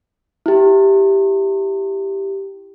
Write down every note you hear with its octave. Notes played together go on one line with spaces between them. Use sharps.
E4 G4